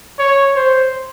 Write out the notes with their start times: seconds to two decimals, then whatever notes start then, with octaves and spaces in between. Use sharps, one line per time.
0.19 C#5
0.56 C5